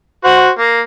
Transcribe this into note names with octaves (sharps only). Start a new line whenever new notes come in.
F#4 C5 F#5
A#3